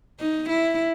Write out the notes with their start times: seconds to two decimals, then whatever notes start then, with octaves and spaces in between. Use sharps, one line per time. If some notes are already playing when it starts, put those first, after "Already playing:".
0.20 D#4
0.49 E4